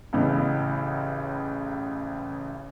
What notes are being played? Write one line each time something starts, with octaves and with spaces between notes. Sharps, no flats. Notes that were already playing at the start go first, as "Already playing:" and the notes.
A1 A2 C#3 E3